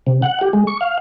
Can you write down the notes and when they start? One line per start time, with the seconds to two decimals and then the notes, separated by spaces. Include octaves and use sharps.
0.07 C3
0.22 F#5
0.41 G4
0.53 G#3
0.67 C#6
0.81 F5